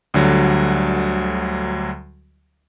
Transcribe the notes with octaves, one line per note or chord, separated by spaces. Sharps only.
D2 D3 F#3 G3